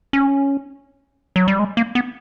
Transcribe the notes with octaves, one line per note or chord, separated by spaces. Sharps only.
C#4
F#3
G3
G#3
A#3
B3